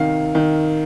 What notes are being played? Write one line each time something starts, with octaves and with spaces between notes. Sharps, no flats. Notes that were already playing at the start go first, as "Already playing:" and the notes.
Already playing: C3 D#3 F5
D#3